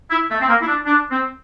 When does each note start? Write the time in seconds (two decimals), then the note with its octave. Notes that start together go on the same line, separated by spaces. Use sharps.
0.11 E4
0.30 A3
0.41 C4
0.49 A#3
0.62 E4
0.67 D4
0.86 D4
1.11 C4